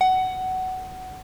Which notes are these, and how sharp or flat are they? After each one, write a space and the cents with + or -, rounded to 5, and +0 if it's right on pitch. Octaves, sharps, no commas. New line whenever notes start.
F#5 +15